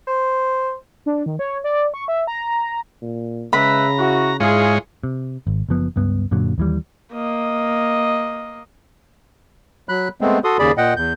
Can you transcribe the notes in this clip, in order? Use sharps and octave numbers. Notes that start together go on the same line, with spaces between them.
C5
D4
D#3
C#5
D5
C#6
E5
A#5
A#2
C#3 G#3 B4 E5 A#5 B5
E4 F#4
G#2 G#3 E4 F4 G#4 C#5
C3
G#1
F#1 F#2 F3 B3
C#2 G2 B3
F#2 A#2 D3 F#3
D#2 E3 G3
A#3 D#5
F#3 B5 F#6
G#3 A3 B3 C4
F#4 A4 C6 D#6
D#2 C#3 G#4 D5 B5
A#2 D#5 F#5 G5
E2 G6